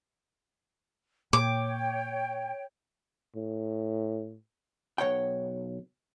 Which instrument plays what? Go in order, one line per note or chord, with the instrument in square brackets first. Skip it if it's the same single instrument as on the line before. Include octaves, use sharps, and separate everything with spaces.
[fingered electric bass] A#2 [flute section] C#5 G5 [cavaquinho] D6
[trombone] A2
[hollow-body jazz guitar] B1 C#5 F#5 G5